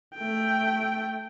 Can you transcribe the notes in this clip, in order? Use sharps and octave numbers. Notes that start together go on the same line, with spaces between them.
A3 G5